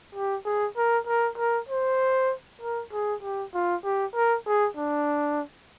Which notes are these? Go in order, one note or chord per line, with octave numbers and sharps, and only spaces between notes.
G4
G#4
A#4
A#4
A#4
C5
A#4
G#4
G4
F4
G4
A#4
G#4
D4